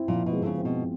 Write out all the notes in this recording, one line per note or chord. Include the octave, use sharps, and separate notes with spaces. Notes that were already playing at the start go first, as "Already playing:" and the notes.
Already playing: C4 E4
A#2 F3
B2
G#3
D3
C#3
C4
B2